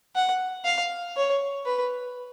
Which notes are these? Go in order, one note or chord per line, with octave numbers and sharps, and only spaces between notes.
F#5
F5
C#5
B4